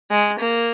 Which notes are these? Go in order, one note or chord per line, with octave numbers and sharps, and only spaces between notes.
G#3
A#3